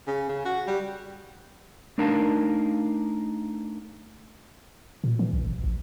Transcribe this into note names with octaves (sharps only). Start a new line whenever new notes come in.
C#3
C#3
F#4
G3
A3 D4 D#4 A#4 F5 A5
A#2
E3
B1
G1
A#1